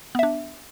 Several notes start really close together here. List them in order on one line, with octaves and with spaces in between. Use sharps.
B3 E5 D4